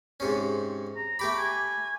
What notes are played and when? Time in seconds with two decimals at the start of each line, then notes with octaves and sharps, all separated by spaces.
0.20 G#2 C3 C#4
0.96 A#5
1.19 A3 G4 B5 D6
1.38 G#5